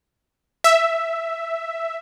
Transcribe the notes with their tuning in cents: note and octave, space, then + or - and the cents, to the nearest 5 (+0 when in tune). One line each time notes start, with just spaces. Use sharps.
E5 +5